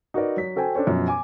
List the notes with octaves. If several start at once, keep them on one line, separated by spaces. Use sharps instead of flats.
D#4 F#4 A#4 B4 D5
F#3 B6
F#4 A4 C5 G5 G#5
D4 A4 C5 C#5
F#2 B2 F3
G#5 D6